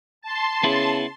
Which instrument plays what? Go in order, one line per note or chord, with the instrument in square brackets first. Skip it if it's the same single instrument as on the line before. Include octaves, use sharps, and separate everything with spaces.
[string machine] A5 C6
[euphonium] C#3 [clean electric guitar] B3 E4